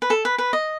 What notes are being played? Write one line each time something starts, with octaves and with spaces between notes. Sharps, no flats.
B4
A4
B4
B4
D#5